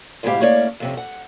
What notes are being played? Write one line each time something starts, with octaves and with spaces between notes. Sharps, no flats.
D2 G#2 B2 E4 G4 F5
A3 A#3 C#4 C#5 D5
F2 C3 C#4
F#5